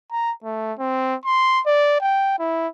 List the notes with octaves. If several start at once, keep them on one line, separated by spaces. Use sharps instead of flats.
A#5
A3
C4
C6
D5
G5
E4